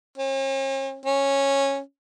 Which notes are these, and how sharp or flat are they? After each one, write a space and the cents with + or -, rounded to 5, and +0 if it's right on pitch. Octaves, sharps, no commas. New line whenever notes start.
C#4 -45
C#4 -10